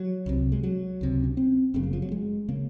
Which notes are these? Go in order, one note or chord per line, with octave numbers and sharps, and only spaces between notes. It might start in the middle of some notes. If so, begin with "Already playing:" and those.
Already playing: F#3
C2 C3
G#3
F#3
C#2 C3
C#4
C4
F#1 F#2 C#3 C4
A#3
F3
F#3
G#3
C#3 A#3